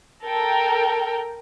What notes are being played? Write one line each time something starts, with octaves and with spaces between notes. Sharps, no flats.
A4 A#4 G5